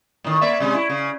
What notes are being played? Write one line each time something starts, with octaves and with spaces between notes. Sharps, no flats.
A2 D#3
A#3 D5 E5
C3 G#3 C#4
E4
C#3